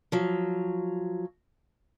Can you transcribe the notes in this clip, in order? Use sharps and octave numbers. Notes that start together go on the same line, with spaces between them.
F3 F#3